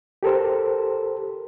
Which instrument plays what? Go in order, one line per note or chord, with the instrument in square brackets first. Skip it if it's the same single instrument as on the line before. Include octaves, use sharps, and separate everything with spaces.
[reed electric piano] G4 A4 A#4 C5